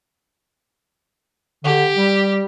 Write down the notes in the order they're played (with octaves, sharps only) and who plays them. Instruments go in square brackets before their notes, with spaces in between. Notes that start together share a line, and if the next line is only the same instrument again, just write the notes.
[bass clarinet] D3 [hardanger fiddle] G4
[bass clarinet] G3